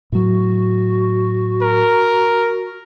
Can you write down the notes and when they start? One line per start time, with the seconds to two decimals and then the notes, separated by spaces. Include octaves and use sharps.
0.12 A2 F#3 F#4
1.62 A#4